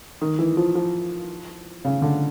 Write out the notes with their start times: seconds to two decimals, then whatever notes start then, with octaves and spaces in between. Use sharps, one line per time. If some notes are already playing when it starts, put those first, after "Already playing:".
0.21 D#3
0.39 E3
0.57 F3
0.75 F3
1.85 C#3
2.02 D3